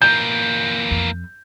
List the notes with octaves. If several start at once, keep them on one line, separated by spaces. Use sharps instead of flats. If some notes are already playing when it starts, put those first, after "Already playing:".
E3 A#3 G6
F2